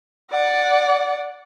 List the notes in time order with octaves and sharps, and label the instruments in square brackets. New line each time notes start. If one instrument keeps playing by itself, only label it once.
[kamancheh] D5 F#5